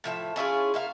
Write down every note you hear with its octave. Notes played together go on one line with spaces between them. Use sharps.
A2 F3 E5
C#4 E4 F4 G#4
A#3 E5 F5